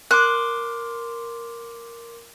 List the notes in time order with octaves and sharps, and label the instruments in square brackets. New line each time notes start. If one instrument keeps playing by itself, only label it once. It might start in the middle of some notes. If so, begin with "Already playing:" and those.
[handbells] A#4 C6 D6 [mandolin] F#6